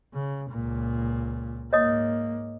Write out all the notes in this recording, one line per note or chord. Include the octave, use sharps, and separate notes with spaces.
C#3
C#2 A#2
G#2 A#3 C#5 D#5 D#6